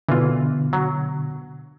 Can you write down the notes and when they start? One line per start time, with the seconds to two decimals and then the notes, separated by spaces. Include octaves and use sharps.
0.09 B2 D3 E3 F4
0.73 F#3